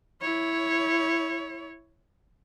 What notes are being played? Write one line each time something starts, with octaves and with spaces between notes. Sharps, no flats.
E4 C#5